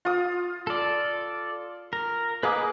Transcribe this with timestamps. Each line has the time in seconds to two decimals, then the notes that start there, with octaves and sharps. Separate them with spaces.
0.05 F4 D#6
0.67 A4 D5
1.93 A#4
2.43 A#3 G#4 B4 D#5 D6